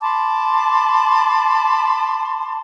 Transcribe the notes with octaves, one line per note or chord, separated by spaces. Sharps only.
A5 B5 C6 D6